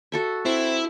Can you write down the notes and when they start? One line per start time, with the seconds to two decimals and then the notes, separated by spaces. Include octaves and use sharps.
0.12 F#4 A4 E5
0.45 C4 E4